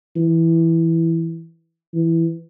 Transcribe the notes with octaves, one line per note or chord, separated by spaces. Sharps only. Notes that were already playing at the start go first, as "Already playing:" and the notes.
E3
E3